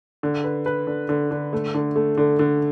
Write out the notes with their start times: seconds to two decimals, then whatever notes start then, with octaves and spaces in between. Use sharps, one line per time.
0.23 D3
0.44 B4
0.66 B4
0.87 D3
1.09 D3
1.31 D3
1.53 A3
1.74 D3
1.96 A3
2.17 D3
2.39 D3